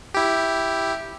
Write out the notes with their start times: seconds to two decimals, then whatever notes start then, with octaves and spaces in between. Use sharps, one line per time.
0.14 E4 G4